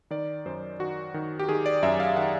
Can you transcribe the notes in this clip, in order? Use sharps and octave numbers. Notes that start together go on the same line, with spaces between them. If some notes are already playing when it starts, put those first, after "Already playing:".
D#3 D5
F#2 C5
D#3 F#4
D#3
G4
D#3 G#4
D5
F#2 E5
F5
D#3 F#5